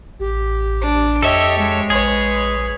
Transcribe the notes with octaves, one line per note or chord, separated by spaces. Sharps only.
A1 G4
D4
F2 G4 A4 C#5 D#5 E5
G#3
A#1 G#4 B4 C#5